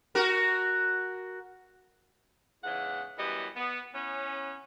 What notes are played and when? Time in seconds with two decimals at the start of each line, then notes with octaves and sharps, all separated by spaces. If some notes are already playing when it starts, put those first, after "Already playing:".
0.15 F#4 A#4
2.64 E2 G#2 C#3 E3 F#5
3.18 F#2 E3 G3 B3 D#5
3.56 B3
3.94 E3 B3 C#4